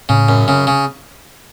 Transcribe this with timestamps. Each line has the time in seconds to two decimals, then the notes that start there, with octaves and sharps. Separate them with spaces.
0.09 A2 C#3
0.29 F#2
0.48 C#3
0.67 C#3